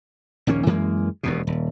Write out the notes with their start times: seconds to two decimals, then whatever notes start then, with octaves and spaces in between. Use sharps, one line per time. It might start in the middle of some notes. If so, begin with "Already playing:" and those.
0.47 A#1 D#2 A#3 C#4
0.67 F#2 E3 G#3 A#3
1.23 E1 D#2 B2
1.47 D#1